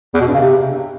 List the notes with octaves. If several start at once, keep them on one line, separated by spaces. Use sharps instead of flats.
E2
B2
G2
C#3
C3